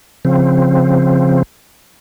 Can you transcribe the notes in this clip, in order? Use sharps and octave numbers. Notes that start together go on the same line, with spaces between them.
C#3 F3 C4